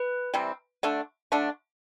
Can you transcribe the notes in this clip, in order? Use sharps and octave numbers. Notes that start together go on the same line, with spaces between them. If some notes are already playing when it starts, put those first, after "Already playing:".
Already playing: B4
C3 E3 G3 C4
D3 A3 D4
D3 A3 D4